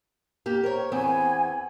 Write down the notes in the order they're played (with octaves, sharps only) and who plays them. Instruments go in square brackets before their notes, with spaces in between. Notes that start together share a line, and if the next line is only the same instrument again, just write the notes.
[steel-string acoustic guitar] A#3 G4
[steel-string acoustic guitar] A#4 C#5 [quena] C5
[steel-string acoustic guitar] E2 B3 C4 [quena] G#5